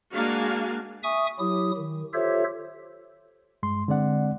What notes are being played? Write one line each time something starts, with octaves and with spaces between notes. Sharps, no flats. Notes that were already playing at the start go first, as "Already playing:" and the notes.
G#3 A#3 D4 F#4 F5 G#5
E5 G#5 C#6 D#6
F#3 E4 G4 D#6
D#3
F4 G4 A4 C5 C#5 E5
G2 G#3 C6
D3 G#3 C4 D5 F#5